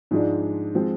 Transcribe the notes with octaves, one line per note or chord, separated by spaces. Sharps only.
G#2 F3 G#3 D4
F3 G#3 C4 F4